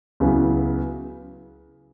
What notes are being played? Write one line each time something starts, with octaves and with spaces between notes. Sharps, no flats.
C#2 C#3 F#3 B3 E4